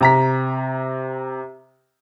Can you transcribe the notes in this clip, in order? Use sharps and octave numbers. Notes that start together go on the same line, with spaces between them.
C3 A#5 B6